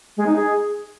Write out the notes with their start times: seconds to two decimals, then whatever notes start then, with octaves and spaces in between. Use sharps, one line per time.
0.17 G#3
0.26 D#4
0.36 G#4